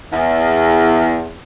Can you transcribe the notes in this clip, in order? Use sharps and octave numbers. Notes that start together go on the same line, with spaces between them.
E2